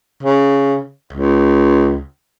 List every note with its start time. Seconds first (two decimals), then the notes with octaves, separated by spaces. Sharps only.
0.23 C#3
1.13 C#2